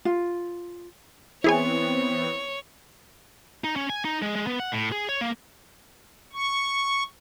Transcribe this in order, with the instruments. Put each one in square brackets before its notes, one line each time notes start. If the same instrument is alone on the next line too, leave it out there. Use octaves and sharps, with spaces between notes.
[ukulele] F4
[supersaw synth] E3 B3 C4 [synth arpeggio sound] E4 G#4 G#5 [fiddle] C#5
[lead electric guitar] D#4
C#4
G#5
D#4
G#3
G#3
B3
F#5
A2
G#4
C#5
A#3
[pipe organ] C#6